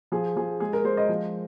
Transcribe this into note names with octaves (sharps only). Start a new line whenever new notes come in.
F3 G#4
F3 G#4
G#3 G#4
A#4
G#3 C5
D#5
F3